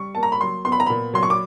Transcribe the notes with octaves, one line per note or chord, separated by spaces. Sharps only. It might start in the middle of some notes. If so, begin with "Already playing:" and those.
Already playing: G3 C#6
A#3 A5
A#5
B5
F#3 C6
B3 C6
B5
A#5
A#2 B5
F#3 C6
C#6
D6